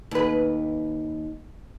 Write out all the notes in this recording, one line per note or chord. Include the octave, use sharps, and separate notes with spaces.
D#2 B4